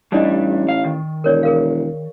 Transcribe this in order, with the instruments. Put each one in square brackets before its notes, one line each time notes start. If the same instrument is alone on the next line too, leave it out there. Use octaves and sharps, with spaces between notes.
[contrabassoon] A1 [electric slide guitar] G3 D4 [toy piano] D#4 D5 D#5
[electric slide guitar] F5
D#3
[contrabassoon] E1 [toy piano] A#4 C#5 D5
[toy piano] G#4 A#4 F5